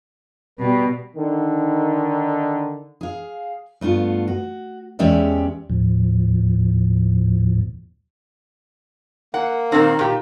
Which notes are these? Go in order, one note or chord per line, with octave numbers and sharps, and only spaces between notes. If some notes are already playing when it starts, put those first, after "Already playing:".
B2 G3 B4
D3 D#3
G#4 F5
G2 A3 B3 F4
F#4
E2 G#3 C#4 G4 D5 E5
D#2 A2 F3
A#3 F#5
A#2 D#3 C4
A#2 G4